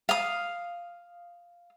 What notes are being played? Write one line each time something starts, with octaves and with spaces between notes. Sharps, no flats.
F5 D#6